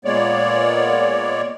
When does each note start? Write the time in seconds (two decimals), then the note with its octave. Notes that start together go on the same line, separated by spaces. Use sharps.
0.05 A#2 G#3 A#3 B3 C#5 D5